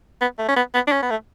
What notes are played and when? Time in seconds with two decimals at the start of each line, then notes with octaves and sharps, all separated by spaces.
0.21 B3
0.39 A3
0.49 C#4
0.57 B3
0.75 B3
0.87 D4
0.92 C#4
1.02 B3
1.10 A3